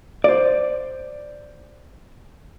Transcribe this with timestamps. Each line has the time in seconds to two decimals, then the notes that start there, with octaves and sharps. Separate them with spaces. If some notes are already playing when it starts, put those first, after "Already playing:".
0.24 C5 D5